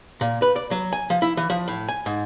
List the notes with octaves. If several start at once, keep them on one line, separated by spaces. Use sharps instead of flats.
A#2
B4
D5
F#3
G#5
F3
E4
E3
F3
A2
G#5
G#2